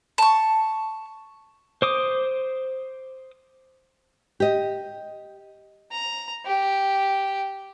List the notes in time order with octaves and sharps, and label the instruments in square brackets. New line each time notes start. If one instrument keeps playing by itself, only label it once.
[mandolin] A5 C#6
[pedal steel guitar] C5 D6 D#6
[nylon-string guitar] G4 D#5
[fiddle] A#5
G4